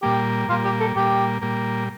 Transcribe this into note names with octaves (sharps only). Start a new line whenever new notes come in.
A#2 G3 A#3 G4
A#2 G3 A#3 F4
G4
A4
A#2 G3 A#3 G4
A#2 G3 A#3